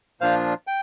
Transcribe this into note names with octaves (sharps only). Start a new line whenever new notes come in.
A#2 F3 D4 F4 C5 F5
G5